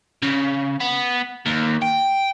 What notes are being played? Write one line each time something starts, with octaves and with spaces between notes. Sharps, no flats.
C#3
B3
D#2
G5